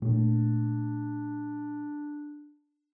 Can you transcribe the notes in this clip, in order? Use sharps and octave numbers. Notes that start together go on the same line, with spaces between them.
A#2 A3 D4